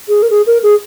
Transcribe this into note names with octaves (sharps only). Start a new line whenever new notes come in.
G#4
A#4
G#4
A#4
G#4